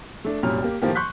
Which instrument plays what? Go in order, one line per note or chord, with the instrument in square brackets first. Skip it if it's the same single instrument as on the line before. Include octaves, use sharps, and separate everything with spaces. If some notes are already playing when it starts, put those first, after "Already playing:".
[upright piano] A3 D4
C2 F#2 A#2 G3 C#5 F6
A#3 G4
A2 D#3 F3 A#3 G4
C6 C#6 F#6 G6 B6